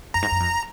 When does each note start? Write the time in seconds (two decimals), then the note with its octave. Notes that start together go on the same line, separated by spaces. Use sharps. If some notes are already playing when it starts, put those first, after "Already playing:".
0.14 F#2 A#5
0.22 G#2
0.31 F#2
0.40 F2